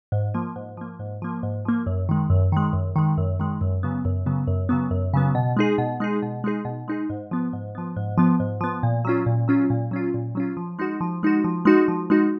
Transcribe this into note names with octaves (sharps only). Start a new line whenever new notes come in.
G#2
F3 A#3
G#2
F3 A#3
G#2
F3 A#3
G#2
F3 A#3
F#2
D#3 G#3
F#2
D#3 G#3
F#2
D#3 G#3
F#2
D#3 G#3
F#2
C#3 F#3 B3
F#2
C#3 F#3 B3
F#2
C#3 F#3 B3
F#2
C#3 F#3 B3
B2
G#3 D#4 G#4
B2
G#3 D#4 G#4
B2
G#3 D#4 G#4
B2
G#3 D#4 G#4
G#2
F3 B3
G#2
F3 B3
G#2
F3 B3
G#2
F3 B3
A#2
F#3 C#4 F4
A#2
F#3 C#4 F4
A#2
F#3 C#4 F4
A#2
F#3 C#4 F4
F3
G#3 D#4 F#4
F3
G#3 D#4 F#4
F3
G#3 D#4 F#4
F3
G#3 D#4 F#4